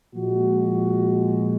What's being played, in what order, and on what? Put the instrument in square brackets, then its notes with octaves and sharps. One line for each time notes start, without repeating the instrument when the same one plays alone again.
[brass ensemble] A#2 F3 G#3 F#4